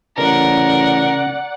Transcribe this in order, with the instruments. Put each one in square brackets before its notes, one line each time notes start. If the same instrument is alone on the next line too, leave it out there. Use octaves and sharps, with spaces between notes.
[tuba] A1 [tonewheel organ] C#3 [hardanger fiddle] A#4 [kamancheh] D5 F#5